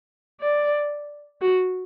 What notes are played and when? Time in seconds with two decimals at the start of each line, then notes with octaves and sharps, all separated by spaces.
0.40 D5
1.41 F#4